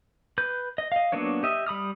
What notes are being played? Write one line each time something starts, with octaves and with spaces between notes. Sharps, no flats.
B4 G6
D#5
D#5 F5
F#3 A#3 B3 D4 C#5
G4 D#5 E5
G3 B5 D#6 F6